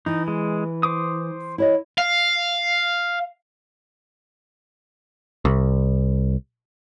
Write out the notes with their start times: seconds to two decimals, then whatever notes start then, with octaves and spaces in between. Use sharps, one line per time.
0.06 E3 D#4
0.28 G#3
0.83 C5 D6 D#6
1.58 E4 C#5 D#5
1.98 F5
5.45 C2